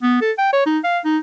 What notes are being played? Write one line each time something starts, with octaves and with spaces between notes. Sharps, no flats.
B3
A4
G5
C#5
D#4
F5
D#4